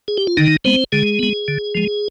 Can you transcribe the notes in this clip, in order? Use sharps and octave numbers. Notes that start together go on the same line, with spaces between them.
G#4
G4
F4
D3 D#3 D#4
G#3 B3 C4 C5
D3 G#3 G#4
G#3 B3
D3
F3 G#3